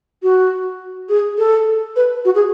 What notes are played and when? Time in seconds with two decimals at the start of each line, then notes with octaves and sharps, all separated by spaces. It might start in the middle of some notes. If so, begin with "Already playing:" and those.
0.23 F#4
1.09 G#4
1.38 A4
1.96 B4
2.25 F#4
2.35 G#4